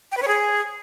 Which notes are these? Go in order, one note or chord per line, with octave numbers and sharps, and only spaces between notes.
G5
B4
C#5
G#4